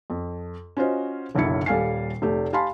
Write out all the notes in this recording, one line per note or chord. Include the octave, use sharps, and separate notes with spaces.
F2
C#4 F4 F#4 C5 D#5
F#1 B1 D3 F#3 E4 C#7
D#1 G3 A4 F5 G#5 C7
F1 A3 G4
G4 F5 G#5 A5 B5 C6